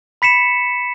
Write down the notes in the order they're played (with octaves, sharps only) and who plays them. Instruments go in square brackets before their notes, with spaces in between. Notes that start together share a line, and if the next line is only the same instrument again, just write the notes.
[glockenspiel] B5 B6 C#7 E7